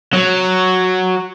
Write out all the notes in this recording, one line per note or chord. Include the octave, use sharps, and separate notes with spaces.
F#3